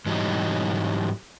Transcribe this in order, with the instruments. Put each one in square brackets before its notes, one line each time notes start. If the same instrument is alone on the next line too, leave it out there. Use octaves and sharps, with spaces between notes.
[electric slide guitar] G#2 E3 F#3 G3 D#4